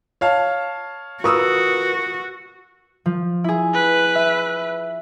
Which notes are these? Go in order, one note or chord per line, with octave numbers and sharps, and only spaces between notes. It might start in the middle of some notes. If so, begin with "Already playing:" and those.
C#5 F5 A5
F4 F#4 A#4 B4 C#6 D#6 E6
F3
E4 G#4
B4
E5